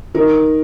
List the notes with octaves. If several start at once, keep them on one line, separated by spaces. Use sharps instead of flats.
D#4 A#4